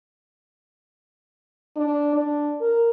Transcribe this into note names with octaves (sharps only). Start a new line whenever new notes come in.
D4
D4
A#4